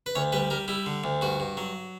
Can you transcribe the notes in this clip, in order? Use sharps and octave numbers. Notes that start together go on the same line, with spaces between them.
B4
D2 C#5
G3 B4
G3 A#4
G3 E4
D3
D2
G2 F#4
G2
F#3